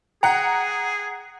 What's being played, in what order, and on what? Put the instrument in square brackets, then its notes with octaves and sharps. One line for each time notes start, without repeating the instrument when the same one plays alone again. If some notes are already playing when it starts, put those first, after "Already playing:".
[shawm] G#4 [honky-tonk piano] F#5 A#5 [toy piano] G5